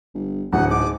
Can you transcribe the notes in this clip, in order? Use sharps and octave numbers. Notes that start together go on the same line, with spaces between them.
G1
D1 D2 F#5
G#2 D6